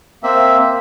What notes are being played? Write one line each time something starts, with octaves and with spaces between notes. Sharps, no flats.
A#3 C4 E5